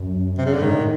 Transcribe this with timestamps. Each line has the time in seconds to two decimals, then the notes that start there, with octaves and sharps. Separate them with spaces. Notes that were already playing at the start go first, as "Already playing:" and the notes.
Already playing: F#2
0.38 C3
0.46 C#3
0.54 D3
0.61 G#2 D#3
0.74 A2